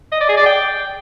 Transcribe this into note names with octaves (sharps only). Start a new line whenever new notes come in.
D#5
D5
G#4
D5
G5